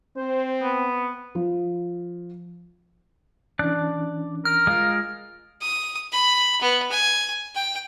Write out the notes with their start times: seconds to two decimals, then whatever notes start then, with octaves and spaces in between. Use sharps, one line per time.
0.17 C4 C5
0.62 B3
1.35 F3
3.59 E3 C#4 D4 D5 A5 F#6
4.45 A#4 F6
4.67 G#3 F4 F5
5.61 D#6
6.12 B5
6.61 B3
6.92 G#5
7.55 G5